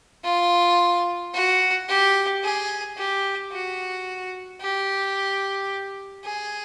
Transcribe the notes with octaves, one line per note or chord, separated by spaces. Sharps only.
F4
F#4
G4
G#4
G4
F#4
G4
G#4